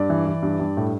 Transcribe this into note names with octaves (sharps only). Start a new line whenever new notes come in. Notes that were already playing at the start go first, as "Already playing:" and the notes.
Already playing: G2 D5
E3
E3
G2
G2
A2